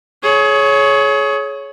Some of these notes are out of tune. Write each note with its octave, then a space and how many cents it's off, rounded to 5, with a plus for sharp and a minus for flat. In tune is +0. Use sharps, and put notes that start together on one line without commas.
G#4 +30 C#5 +0